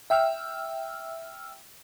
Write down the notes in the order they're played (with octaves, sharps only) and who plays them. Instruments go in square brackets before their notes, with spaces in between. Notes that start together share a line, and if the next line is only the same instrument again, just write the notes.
[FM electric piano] E5 G5 E6 F6